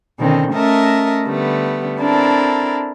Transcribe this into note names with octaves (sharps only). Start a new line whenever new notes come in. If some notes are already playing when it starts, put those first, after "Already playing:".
B2 D3 D#3 C4 C#4
A3 C#4 A#4 D#5 E5 A5
D3 G3 A3 B3
C4 D4 E4 A4 A#4